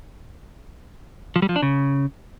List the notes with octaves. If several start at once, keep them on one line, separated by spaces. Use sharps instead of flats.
F3
G3
F3
D4
C#3